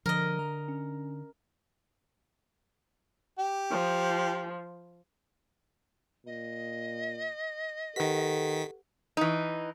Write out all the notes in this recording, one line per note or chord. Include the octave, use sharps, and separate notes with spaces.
D3 F3 A#4 D#5
A#5
C#4
G4
F3
A#2 D#5
D#3 G4 A4 B4 F#5 B6
E3 D#4